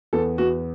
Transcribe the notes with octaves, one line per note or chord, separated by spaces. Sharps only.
E2 A4
E2 F#4